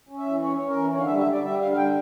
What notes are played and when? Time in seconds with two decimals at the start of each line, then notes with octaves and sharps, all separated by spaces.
0.09 C#4
0.18 E5
0.26 E3
0.43 C#4 C#5
0.57 C#4 C#5
0.68 A#4
0.76 E3
0.93 D3 C#5
1.00 F5
1.06 E5
1.10 G3
1.19 E5
1.27 G3 D5
1.43 G3 E5
1.61 D3 F5
1.72 F5
1.77 G3 G5